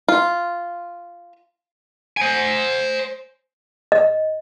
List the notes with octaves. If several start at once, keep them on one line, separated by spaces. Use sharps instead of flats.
F4
C5 G#5
D#5